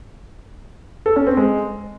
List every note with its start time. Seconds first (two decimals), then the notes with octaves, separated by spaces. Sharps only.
1.06 A4
1.16 C#4
1.27 C4
1.37 G#3